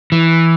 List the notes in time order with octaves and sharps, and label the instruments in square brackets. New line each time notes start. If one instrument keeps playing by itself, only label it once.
[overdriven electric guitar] E3